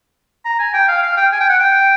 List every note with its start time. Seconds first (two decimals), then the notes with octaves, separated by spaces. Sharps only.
0.45 A#5
0.59 G#5
0.74 G5
0.88 F5
1.03 F5
1.17 G5
1.32 G#5
1.40 G5
1.49 F#5
1.60 G5